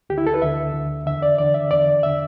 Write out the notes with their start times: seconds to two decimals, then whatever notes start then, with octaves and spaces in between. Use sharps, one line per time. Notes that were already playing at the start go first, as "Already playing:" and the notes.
0.10 D2 D3 G4
0.18 E4
0.27 A4
0.34 B4
0.42 D2 D3 E5
0.74 D2 D3
1.06 E2 D3 E5
1.22 D5
1.38 E2 D3 D5
1.54 E5
1.71 E2 D3 D5
2.03 D3 E5